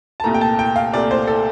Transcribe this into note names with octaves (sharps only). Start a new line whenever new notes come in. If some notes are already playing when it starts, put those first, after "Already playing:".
A5
C2 A#2 A3 A#5
G5
A5
G5
F5
C2 A#2 A3 D5
C5
A4